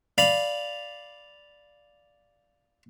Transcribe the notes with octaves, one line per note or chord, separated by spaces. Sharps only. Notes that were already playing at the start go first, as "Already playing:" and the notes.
D5 F5 B5